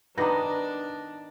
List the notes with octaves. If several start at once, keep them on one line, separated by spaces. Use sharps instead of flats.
D#3 B3 D4 B4 D#5 A#5 D6 A#6